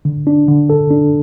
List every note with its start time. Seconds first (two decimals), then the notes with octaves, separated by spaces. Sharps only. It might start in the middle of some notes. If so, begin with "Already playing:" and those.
0.05 D3
0.27 D4
0.48 D3
0.70 A4
0.90 D4